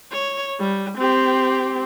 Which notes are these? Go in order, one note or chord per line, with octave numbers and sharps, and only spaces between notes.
C#5
G3
C4 G4